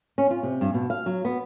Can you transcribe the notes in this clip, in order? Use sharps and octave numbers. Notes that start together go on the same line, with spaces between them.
C#4
F4
C3
G2
B2
F5
F#3
B3